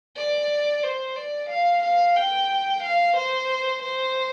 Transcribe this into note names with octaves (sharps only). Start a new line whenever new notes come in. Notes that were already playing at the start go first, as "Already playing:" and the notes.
D5
C5
D5
F5
F5
G5
F5
C5
C5